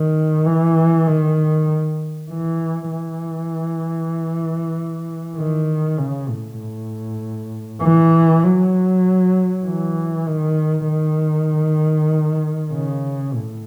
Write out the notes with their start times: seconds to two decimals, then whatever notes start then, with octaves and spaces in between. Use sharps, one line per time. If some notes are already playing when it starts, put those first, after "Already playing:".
Already playing: D#3
0.46 E3
1.07 D#3
2.30 E3
2.91 E3
5.37 D#3
5.98 C#3
6.29 A2
6.59 A2
7.82 E3
8.43 F#3
9.65 E3
10.27 D#3
10.89 D#3
12.72 C#3
13.34 A2